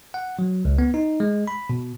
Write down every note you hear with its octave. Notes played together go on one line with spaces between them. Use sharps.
F#5
F#3
C#2
B3
D#4
G#3
B5
B2